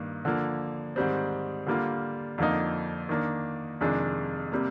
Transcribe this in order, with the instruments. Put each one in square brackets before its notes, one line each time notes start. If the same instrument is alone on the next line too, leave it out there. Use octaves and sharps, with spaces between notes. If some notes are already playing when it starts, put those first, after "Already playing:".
Already playing: [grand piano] G2 D#3 A#3
D3 F3 A#3
G#2 D#3 G3 C4
D3 G3 A#3 F4
F2 D3 F3 A#3 D#4
D#3 A#3 D4
F2 C3 D#3 G#3 D4
C3 G3 A#3